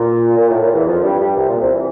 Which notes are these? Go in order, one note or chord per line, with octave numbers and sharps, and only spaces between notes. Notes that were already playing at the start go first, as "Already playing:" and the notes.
Already playing: A#2
A#2
A2
A#2
E2 E3
F2 F3
G2 G3
G2 G3
C2 C3
A#2
C2 C3
E3